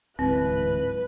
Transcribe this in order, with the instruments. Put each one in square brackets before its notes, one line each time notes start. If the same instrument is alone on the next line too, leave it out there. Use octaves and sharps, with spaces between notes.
[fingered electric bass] D1 G#2 E3 [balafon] C4 [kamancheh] B4